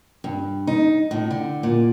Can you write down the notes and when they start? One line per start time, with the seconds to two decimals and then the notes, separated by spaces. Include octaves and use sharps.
0.24 G2
0.67 D#4
1.11 A2
1.31 D3
1.63 A#2